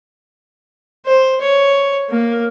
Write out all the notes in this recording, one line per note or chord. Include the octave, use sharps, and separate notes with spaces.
C5
C#5
A#3